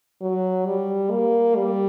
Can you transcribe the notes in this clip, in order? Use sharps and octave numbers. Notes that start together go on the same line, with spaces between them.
F#3
G3
A#3
G3